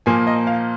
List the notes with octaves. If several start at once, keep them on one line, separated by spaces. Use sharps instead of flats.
A#2 F3 A#3 G#5
D#5
F5